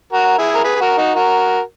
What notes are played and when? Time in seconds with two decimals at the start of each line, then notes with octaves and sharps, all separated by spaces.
0.13 F#4 A#4
0.38 E4 G#4
0.55 A#4
0.64 G#4 B4
0.76 G#4
0.81 F#4 A#4
0.98 D#4 F#4
1.15 F#4 A#4